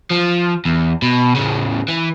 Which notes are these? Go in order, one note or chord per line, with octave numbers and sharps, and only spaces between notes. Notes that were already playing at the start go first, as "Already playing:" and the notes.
F3
E2
B2
A2 C#3
E3